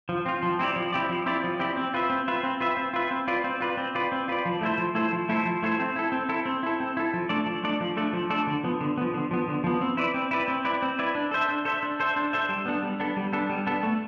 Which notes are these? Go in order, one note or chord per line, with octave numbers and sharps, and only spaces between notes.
F3
C4 F4
F3
C4 E4 G4 D5
F3
C4 E4 G4 D5
F3
C4 E4 G4 D5
F3
C4 E4 G4 D5
C4
F4 B4 E5
C4
F4 B4 E5
C4
F4 B4 E5
C4
F4 B4 E5
C4
F4 B4 D5
C4
F4 B4 D5
C4
F4 B4 D5
C4
F4 B4 D5
F3
A3 E4 A4 C5
F3
A3 E4 A4 C5
F3
A3 E4 A4 C5
F3
A3 E4 A4 C5
C4
E4 A4
C4
E4 A4
C4
E4 A4
C4
E4 A4
F3
A3 D4 A4 D5
F3
A3 D4 A4 D5
F3
A3 D4 A4 D5
F3
A3 D4 A4 D5
D3
F3 B3
D3
F3 B3
D3
F3 B3
D3
F3 B3
C4
E4 B4 D5
C4
E4 B4 D5
C4
E4 B4 D5
C4
E4 B4 D5
D4
A4 C5 E5
D4
A4 C5 E5
D4
A4 C5 E5
D4
A4 C5 E5
G3
B3 D4 A4
G3
B3 D4 A4
G3
B3 D4 A4
G3
B3 D4 A4
A3